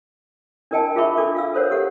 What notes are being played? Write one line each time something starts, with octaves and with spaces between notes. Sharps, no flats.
D4 E4 A#4 D#5 G5 A5
F4 G#4 A#4 E5 B5 C#6
D4 F4 A4 D6
F4 F5 E6
A4 A#4 C5 C#5 F#5
G4 A4 F#5